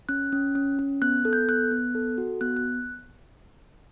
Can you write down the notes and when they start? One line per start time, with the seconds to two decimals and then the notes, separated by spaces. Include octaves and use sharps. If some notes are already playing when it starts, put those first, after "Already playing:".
0.09 C#4 F#6
0.32 C#4
0.55 C#4
0.79 C#4
1.02 B3 F#6
1.25 A4
1.33 G6
1.48 B3 F#6
1.71 B3
1.95 A4
2.18 F#4
2.41 B3 F#6
2.56 F#6